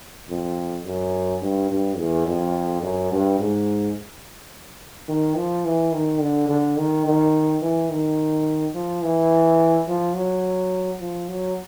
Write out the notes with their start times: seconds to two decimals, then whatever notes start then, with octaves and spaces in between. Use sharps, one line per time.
0.29 F2
0.86 F#2
1.42 G2
1.71 G2
1.98 E2
2.27 F2
2.82 F#2
3.12 G2
3.39 G#2
5.08 D#3
5.37 F3
5.65 E3
5.92 D#3
6.21 D3
6.49 D3
6.77 D#3
7.06 D#3
7.62 E3
7.90 D#3
8.74 F3
9.03 E3
9.88 F3
10.15 F#3
11.00 F3
11.29 F#3